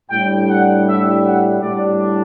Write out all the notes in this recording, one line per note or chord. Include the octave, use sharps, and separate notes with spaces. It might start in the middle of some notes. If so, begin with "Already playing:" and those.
A2 G3 D4 G5
F#5
E5
F#5
A2 G3 D4 D5